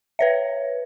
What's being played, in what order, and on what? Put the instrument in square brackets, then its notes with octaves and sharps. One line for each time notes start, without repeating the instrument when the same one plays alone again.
[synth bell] B4 C#5 E5